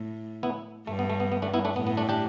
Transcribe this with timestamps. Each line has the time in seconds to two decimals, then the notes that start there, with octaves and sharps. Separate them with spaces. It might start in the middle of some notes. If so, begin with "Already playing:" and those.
Already playing: A2
0.43 B3 E4
0.87 G2 A3
0.99 B3
1.10 A3
1.20 B3
1.32 B3
1.42 A3 D4
1.54 B3 E4
1.65 A3 D4
1.76 A2 B3
1.87 B3
1.97 A3 D4
2.09 D4 G4